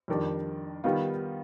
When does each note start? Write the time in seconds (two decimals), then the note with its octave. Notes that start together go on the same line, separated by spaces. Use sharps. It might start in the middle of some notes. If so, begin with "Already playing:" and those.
0.08 F2 D#3 G3 D4
0.84 D#3 G3 B3 F4